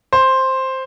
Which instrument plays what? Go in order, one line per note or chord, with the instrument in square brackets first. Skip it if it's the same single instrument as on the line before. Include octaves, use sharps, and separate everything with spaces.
[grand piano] C5